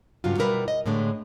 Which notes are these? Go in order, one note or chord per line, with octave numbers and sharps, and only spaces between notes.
G2 C#3 F#3 F4
B2 G3 E4 A#4 B4
D#5
A2 D3 G#3 A3